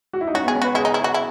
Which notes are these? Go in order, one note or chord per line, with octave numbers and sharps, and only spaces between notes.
F#4
E4
D#4
C#4 F#4
B3
G#4
C#4
F#4 B4
E4 G#4
D#4
E4
F#4
E4